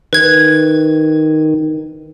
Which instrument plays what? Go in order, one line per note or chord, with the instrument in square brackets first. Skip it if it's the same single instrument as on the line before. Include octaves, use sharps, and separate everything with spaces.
[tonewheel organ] D#3 [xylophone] B4 G#6